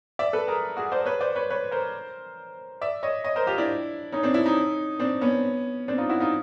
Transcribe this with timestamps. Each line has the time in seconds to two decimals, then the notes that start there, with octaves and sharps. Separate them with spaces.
0.19 D5 E5
0.33 A4 B4
0.48 G#4 A#4
0.77 F#4 G#4
0.92 C5 D5
1.06 B4 C#5
1.21 C5 D5
1.35 B4 C#5
1.50 B4 C#5
1.71 A#4 C5
2.81 D5 E5
3.03 C#5 D#5
3.24 C#5 D#5
3.36 A#4 C5
3.47 F4 G4
3.58 D4 E4
4.12 C#4 D#4
4.23 C4 D4
4.34 D4 E4
4.46 C#4 D#4
4.99 C4 D4
5.21 B3 C#4
5.88 C4 D4
5.98 D#4 F4
6.09 E4 F#4
6.20 D#4 F4